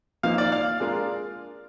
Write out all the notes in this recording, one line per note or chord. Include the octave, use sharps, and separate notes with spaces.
F3 A#3 D#4 F5
D5
F5
G#3 D4 F4 A#4